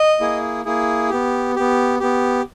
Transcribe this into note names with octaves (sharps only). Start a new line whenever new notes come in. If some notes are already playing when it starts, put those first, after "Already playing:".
Already playing: D#5
A#3 E4 G#4
A#3 E4 G#4
B3 G4
B3 G4
B3 G4